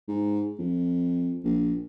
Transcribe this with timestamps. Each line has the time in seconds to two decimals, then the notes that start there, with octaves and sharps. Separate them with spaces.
0.08 G#2
0.59 F2
1.44 A#1